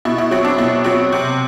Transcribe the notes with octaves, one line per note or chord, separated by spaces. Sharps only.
B2 E4
E4
F#3 C4
D4
B2 E4
F#3 C4
C3